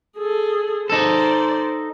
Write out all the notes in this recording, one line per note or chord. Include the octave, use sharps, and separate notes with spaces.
G#4 A4
D#4 A4 C5 D5